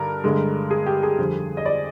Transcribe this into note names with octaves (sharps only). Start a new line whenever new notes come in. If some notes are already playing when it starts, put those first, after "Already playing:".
Already playing: G2 D3 A#4
G2 D3 G#3
G#4
G4
G#4
F2 D3 G3
D#5
D5